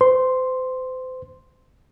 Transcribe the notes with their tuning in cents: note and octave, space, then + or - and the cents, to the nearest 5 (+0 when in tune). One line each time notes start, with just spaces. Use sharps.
C5 -35 C6 +0